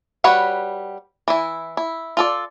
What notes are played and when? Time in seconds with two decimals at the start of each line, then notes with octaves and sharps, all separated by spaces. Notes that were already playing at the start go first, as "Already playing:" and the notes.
0.24 G3 F#4 B4 C#5 F#5
1.28 E3 E4
1.77 E4
2.17 F4 A4 D5